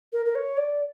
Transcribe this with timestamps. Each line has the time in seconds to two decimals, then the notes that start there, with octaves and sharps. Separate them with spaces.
0.13 A#4
0.26 A#4
0.35 C#5
0.57 D5